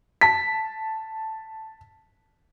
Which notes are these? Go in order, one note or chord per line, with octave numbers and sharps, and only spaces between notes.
A5 B6